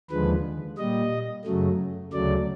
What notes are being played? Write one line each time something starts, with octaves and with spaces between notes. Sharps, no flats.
D#2 D3 F3 G#3 B4
A#2 G3 D#5
F#2 C#3 F#3 A3
D2 C#3 F#3 A3 D5